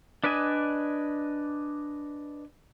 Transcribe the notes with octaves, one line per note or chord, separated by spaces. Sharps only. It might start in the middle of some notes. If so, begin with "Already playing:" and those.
D4 B4 D5 D#5 G#5